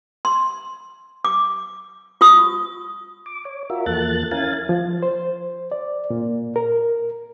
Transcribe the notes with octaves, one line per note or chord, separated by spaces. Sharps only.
C6
D6
F4 C#6 D#6
D6
C#5
F4 F#4 A#4 E5
E2 F3 A#3 A4 F#6 A6
C#4 E4 A#4 F5 G#5 A6
F3
C5
D5
A#2
A#4